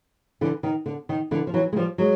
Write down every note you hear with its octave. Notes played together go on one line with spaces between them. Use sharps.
D3 E3
D#3
D3
D#3
D3 E3
F3
E3 F#3
G#3
F3 G3
F#3 G#3